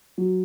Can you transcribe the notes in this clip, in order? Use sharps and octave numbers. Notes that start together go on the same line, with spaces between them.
F#3